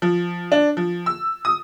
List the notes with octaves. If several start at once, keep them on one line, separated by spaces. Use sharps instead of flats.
F3
D4
F3
E6
D#6